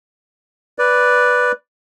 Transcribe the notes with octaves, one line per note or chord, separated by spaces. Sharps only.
B4 D5